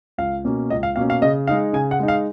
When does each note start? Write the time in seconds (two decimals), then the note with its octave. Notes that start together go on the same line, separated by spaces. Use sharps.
0.18 C#2 F5
0.45 B2 A#3 C#4
0.70 C#2 D#5
0.83 F5
0.96 B2 A#3 C#4 F5
1.10 F5
1.22 C#3 D#5
1.47 G#3 D#4 F5
1.73 C#3 G#5
1.91 F#5
1.99 G#3 D#4
2.08 F5